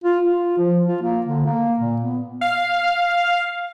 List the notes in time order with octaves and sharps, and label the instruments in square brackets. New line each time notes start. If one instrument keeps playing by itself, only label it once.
[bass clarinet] F4
F4
F3
F4
A#3
D3
A#3
A#2
B3
[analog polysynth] F5